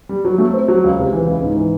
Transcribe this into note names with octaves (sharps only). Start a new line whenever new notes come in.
G3
F#3
A3
C4
F#3
C#2
C3
E3
C#2
G#2
E3